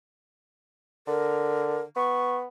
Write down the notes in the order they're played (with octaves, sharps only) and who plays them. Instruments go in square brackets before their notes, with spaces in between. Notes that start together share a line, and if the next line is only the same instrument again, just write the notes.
[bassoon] D3 [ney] A#4
[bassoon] B3 [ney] C#6